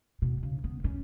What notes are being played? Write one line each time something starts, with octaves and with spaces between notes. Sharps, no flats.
B2
C#3
B3
C#4